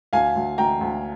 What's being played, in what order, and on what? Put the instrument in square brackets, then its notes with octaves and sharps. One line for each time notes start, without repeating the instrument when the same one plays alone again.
[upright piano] D2 F5 G#5
D2
D2 G5 A#5
D2